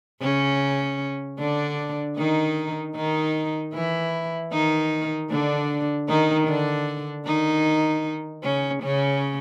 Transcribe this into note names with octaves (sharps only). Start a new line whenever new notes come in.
C#3 C#4
D3 D4
D#3 D#4
D#3 D#4
E3 E4
D#3 D#4
D3 D4
D#3 D#4
D3 D4
D#3 D#4
C#3 C#4
C#3 C#4